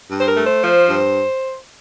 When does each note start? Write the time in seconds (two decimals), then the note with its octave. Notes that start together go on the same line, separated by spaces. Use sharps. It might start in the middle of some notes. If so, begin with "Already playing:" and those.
0.08 G2
0.19 C5
0.26 A#4
0.35 A3
0.44 C5
0.62 F3
0.88 G2